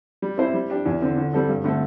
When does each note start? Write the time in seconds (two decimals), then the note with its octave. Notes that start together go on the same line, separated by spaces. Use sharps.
0.22 G3
0.38 C4 E4 C5
0.54 G3
0.70 D4 G4
0.86 E2
1.02 D3 C4
1.17 D3
1.33 G3 C4 A4
1.49 G2
1.64 D3 A3 C4 A4